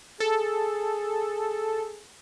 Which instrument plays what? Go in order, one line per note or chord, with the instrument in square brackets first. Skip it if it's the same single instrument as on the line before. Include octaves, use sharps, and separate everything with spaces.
[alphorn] G#4 [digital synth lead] A4